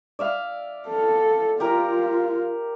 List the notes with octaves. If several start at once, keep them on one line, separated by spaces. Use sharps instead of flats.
D5 E5 F5
A4
F4 G4 A#4 A#5